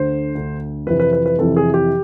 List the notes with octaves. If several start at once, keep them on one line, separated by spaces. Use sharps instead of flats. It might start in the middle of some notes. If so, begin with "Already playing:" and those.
Already playing: D2 D3 C5
D2 D3
F2 C3 E3 B4
B4
B4
B4
F2 C3 E3 A4
G#4
G4